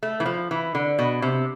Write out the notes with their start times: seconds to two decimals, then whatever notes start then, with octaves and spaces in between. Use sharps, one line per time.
0.03 A3
0.20 E3
0.26 F3
0.51 E3
0.75 D3
0.99 B2
1.22 C3